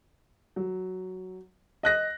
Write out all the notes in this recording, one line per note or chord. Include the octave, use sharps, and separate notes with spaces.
F#3
D#5 F#6 A#6